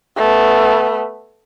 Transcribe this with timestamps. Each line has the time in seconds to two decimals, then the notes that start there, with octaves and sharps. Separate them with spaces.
0.17 A3 B3